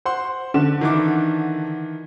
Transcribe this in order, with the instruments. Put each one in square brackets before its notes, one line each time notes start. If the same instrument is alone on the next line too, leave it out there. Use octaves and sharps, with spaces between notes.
[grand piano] C5 F#5 C6
[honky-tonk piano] D3 [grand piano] E7
[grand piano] D#3 E3 D6